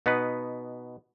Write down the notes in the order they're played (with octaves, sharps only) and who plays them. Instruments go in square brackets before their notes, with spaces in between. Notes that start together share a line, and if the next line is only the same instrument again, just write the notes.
[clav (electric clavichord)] B2 B3 D#4 B4